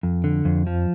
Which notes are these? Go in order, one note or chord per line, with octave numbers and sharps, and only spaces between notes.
F2
D3
F2
F3